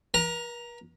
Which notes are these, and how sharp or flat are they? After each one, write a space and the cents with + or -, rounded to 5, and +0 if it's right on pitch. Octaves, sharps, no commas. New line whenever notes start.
A#4 +45 A#5 +0